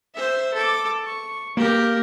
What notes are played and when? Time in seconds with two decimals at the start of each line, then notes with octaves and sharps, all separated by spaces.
0.15 C5 E5
0.54 A4 D6
1.05 C#6
1.57 A#3 G4 A#4